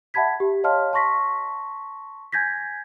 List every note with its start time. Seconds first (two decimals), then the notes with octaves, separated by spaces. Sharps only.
0.14 E5 F#5 A5 B5 G#6 B6
0.40 G4
0.64 C#5 D#5 F5 A5 C6 F6
0.93 A5 C6 C#6 A#6 B6
2.32 G#5 G6 G#6 A#6 B6